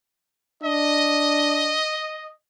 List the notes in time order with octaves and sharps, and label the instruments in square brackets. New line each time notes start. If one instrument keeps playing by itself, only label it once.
[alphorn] D4 [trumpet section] D#5